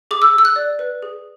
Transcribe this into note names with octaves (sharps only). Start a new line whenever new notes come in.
G#4 D6
E6
G#4 E6
F#6
D5
B4
G#4